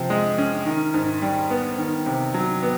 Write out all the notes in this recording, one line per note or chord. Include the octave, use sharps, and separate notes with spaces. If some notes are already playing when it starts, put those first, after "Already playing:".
Already playing: C3 F3
G#3
C#4
D#3
G#2
G3
B3
D#3
C3
F#3
B3